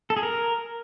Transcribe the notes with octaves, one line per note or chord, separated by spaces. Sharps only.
A4
G#4
A#4